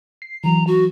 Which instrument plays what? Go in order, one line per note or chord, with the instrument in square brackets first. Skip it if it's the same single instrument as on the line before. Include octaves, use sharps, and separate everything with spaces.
[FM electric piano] C7
[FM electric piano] E3 F#3 [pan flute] A#5
[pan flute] F#4